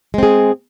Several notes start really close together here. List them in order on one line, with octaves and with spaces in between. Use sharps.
G#3 C4 G#4